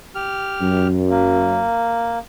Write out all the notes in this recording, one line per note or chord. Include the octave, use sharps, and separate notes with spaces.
G4 F6
F#2
A#3